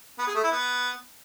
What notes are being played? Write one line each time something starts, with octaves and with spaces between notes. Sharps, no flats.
B3
G#4
A3
E4
B3